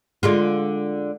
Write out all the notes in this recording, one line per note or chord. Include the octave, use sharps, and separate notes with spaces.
D3 G#3 F4